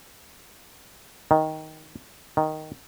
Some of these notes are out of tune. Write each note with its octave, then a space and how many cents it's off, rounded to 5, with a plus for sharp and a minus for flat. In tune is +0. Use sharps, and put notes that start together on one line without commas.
D#3 +10
D#3 +0